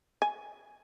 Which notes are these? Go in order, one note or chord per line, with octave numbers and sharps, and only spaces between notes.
G#5